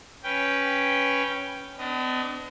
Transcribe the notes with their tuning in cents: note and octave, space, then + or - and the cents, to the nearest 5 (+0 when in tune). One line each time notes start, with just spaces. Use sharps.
C#4 +0 B4 +0 G5 +0
B3 +45 D4 +0 D#5 +0